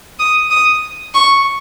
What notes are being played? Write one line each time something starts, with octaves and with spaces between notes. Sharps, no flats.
D#6
D#6
C#6